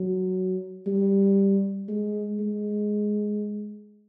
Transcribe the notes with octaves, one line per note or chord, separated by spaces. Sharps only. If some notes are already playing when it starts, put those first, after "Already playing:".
Already playing: F#3
G3
G#3
G#3